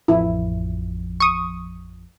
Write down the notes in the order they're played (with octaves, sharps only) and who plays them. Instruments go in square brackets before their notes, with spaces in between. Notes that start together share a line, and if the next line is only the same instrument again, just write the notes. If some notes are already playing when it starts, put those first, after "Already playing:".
[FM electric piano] A1 F2 F3 [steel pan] E4
[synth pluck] C#6 D#6